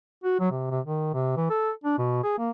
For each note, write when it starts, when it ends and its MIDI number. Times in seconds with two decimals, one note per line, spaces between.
0.24 0.36 66
0.40 0.51 54
0.51 0.69 48
0.70 0.80 48
0.85 1.14 51
1.14 1.34 48
1.37 1.46 52
1.50 1.71 69
1.84 1.97 62
1.98 2.21 47
2.24 2.35 68
2.38 2.50 58